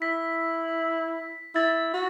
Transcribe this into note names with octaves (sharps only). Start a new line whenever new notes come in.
E4 B6
E4 A6
F#4